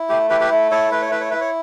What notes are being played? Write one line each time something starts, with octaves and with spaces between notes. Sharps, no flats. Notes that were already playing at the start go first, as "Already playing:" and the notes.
Already playing: E4
A3 G4
E4 G4 B4
G4 B4
A3
E4 A4 C#5
A3 B4
C#5
E4 B4
C#5
E4 B4
C#5